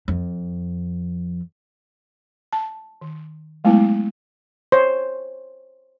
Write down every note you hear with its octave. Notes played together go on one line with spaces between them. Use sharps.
F2
A5
D#3
F#3 G#3 A3 B3 E4
C5 C#5